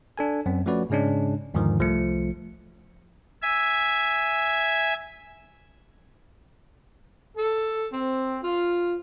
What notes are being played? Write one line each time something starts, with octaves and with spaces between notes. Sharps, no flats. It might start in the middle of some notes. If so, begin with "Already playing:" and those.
D4 A4 G#5
F#2 C4
F3 A3 C#4 F#4 B4 D5
G#2 C#3 G#3 C#4 D4
E2 G#2 D3 D#3 F3
C2 F3 A3 C#7
E5 G#5
A4
C4
F4